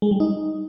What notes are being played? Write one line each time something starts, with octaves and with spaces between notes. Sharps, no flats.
G#3
G3
D#4